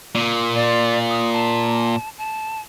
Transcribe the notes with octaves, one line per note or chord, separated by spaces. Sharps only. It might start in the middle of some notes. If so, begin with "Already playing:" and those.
A#2
D5
D#6
A5
A5